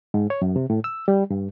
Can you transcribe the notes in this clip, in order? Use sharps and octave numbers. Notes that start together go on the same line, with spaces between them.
G#2
C#5
F#2
C3
A2
E6
G3
G2